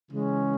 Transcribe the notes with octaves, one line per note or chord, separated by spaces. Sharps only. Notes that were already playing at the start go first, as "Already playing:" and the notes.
C#3 E3 G#3 C#4